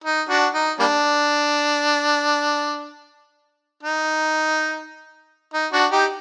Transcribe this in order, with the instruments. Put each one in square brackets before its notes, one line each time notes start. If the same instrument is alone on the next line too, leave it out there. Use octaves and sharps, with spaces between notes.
[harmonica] D#4
D4 F#4
D#4
G3 A#3 D4
D#4
D#4
D4 F#4
D#4 G4